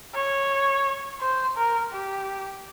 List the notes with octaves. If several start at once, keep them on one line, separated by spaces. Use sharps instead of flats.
C#5
C5
A#4
G4